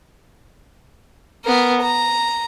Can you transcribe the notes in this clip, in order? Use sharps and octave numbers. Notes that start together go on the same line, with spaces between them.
B3 A#4
A#5